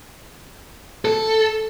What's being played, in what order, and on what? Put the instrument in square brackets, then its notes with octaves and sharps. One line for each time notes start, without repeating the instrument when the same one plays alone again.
[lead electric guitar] A4